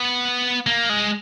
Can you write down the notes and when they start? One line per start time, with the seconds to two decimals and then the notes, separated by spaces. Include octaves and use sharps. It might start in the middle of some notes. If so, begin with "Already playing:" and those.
Already playing: B3
0.67 A#3
0.89 G#3